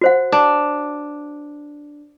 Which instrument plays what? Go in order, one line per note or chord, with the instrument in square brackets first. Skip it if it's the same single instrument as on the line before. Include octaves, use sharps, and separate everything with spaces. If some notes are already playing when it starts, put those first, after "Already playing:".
[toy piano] F#4 C5 F#5
[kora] D4